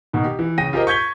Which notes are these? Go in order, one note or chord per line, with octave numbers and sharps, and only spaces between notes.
B2 D#3
G4
E3
C#3 G5 A#6 D#7
F4 G4 G#4 A#4 C5 D#5
C#6 G6 G#6 B6 G7